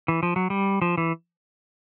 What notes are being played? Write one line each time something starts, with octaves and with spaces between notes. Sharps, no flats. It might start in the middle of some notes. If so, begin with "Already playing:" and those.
E3
F3
F#3
G3
F3
E3